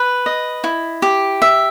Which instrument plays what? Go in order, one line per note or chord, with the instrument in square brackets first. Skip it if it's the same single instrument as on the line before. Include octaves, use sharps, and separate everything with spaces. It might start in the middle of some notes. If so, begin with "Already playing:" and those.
Already playing: [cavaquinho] B4
D#5
E4
G4
E5